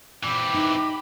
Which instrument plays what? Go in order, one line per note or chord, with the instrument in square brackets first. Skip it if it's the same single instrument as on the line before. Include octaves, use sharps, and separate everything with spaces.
[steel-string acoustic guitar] A#2 [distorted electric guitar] E3 C4 [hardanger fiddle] G4 B5 [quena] D6
[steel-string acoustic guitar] D#4